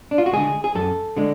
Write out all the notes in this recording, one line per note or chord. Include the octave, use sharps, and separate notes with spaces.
D4
F4
F#4
D3 G#3 G#4
G#4
F#2 A4
D3 G#3